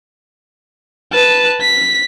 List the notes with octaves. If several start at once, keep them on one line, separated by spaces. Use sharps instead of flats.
B4 A5
B6